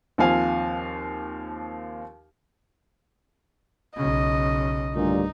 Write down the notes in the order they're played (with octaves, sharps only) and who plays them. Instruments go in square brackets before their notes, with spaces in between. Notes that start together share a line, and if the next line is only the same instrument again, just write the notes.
[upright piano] D#2 F3 C4 F5 G#5
[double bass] B1 C#3 [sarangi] D#5
[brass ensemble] D2 G2 A#2 [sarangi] D#4